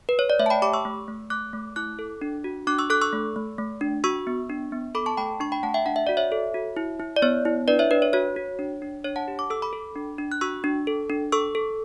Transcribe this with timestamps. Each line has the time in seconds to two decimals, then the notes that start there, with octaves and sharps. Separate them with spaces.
0.09 B4
0.19 C#5
0.30 D5
0.39 A3 C#5 E5
0.46 A5
0.50 G5 B5
0.62 G4 B5 D6
0.73 C#6 E6
0.85 A3
1.08 A3
1.30 A3 D6 F#6
1.53 A3
1.76 E4 D6 F#6
1.99 A4
2.22 D4
2.44 F#4
2.67 D4 D6 F#6
2.79 C#6 E6
2.90 A4 D6 F#6
3.01 C#6 E6
3.13 A3
3.36 A3
3.58 A3
3.81 D4
4.04 F#4 C#6 E6
4.27 B3
4.49 D4
4.72 B3
4.95 A4 B5 D6
5.06 A5 C#6
5.17 A3 G5 B5
5.40 D4 C#6
5.52 G5 B5
5.63 A3 F#5 A5
5.74 E5 G5
5.86 D4 F#5
5.96 E5
6.07 F#4 D5
6.17 C#5 E5
6.32 A4
6.54 F#4
6.77 E4
7.00 E4
7.16 D5
7.22 B3 C#5
7.45 E4
7.68 D4 B4 D5
7.79 C#5 E5
7.91 D4 B4
8.02 C#5
8.13 F#4 C#5
8.36 F#4
8.59 D4
8.82 D4
9.04 D4 C#5
9.16 F#5 A5
9.28 G4
9.39 D6
9.50 A4 E6
9.62 B5 D6
9.73 A4
9.95 D4
10.18 D4
10.32 F#6
10.41 F#4 C#6 E6
10.64 D4
10.87 A4
11.10 D4
11.32 A4 C#6 E6
11.55 A4